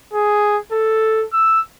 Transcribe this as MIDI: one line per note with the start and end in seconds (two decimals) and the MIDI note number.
0.14 0.59 68
0.73 1.25 69
1.34 1.60 88